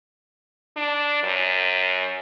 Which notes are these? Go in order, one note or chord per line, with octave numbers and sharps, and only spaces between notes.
D4
F#2